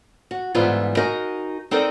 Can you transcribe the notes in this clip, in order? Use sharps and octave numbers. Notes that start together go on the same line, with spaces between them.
F#4
G#2 D3 E3 G3 B3 F4
D#4 F#4 G#4 A#4 D#5
C4 D#4 A4 A#4 D5